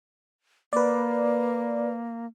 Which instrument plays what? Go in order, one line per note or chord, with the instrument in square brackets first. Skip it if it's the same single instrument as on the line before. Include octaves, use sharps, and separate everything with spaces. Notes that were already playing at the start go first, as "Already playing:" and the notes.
[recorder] A#3 [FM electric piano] B4 D5